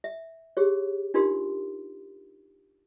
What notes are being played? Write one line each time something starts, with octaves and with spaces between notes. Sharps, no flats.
E5
G4 G#4 C#5
D4 D#4 F4 G4 A#4 C6